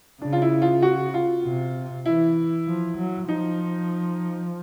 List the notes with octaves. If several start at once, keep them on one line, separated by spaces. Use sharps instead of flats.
C#3 D4
F4
E4
F4
F#4
F4
C3
E3 E4
F3
F#3
F3 D#4